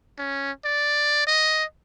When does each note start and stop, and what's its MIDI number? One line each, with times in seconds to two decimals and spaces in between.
0.19 0.51 61
0.65 1.23 74
1.27 1.64 75